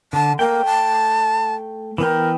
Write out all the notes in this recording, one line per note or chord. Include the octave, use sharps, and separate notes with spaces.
D3 A5
A3 A#3 G5
A5
E3 B3 A#4 G5